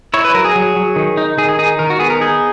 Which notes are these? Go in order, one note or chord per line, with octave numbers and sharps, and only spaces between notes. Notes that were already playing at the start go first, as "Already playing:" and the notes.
E4 C#5
B4
F#3 A#4
G#4
F#3
F#3
D#3
D#4
D#3 G#4
G#4
D#4 G#4
D#3 A#4
F#4
B3 G#4
A#4
D#4 G#4